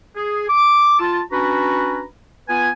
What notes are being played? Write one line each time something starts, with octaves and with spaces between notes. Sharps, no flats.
G#4
D6
F4 A5
C#4 D4 F#4 B4 A#5 B5
B3 F4 B4 G#5